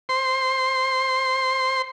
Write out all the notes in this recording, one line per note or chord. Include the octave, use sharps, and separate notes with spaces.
C5 C6